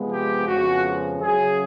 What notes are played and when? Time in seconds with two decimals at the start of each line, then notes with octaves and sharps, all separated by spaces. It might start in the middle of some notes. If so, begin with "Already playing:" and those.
Already playing: C3 F3 G#3 B3
0.11 G4
0.47 F2 C#3 F3 G#3 B3 F#4
1.21 F#2 C#3 F#3 G#4